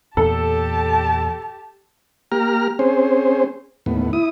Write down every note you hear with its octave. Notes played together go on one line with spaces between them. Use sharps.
E2 A#2 G4 A4 A5
A#3 G4 A#5 F6
C4 C#4 G#4 C5
D#2 A2 B3
E4 D#6